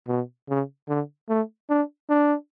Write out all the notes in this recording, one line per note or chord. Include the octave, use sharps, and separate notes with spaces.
B2
C#3
D3
A3
D4
D4